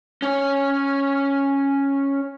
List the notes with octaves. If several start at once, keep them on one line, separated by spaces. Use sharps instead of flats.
C#4 C#5